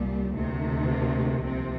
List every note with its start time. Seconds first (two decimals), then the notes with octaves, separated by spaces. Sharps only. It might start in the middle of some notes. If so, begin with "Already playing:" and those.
Already playing: C2 A#2 G3
0.33 D2 C3 D#3
0.88 A#3
1.43 C2 C3 F3 C4